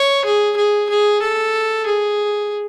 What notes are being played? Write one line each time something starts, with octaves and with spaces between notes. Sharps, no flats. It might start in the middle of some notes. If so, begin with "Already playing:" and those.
Already playing: C#5
G#4
G#4
G#4
A4
G#4